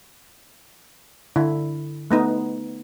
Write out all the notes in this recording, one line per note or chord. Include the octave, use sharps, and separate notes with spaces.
D3 E4
A3 B3 D#4